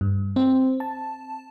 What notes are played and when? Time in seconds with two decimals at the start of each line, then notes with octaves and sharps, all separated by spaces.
0.01 G2
0.36 C4
0.80 A5